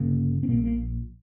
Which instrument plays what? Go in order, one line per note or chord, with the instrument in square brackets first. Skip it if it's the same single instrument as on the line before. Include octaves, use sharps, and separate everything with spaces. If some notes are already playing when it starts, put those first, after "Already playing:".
Already playing: [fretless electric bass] G1 C#3 A#3
C4
A#1 A#2 A#3
A#3